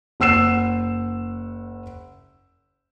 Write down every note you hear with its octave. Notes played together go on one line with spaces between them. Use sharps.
F#1 F#5 E6 C7 E7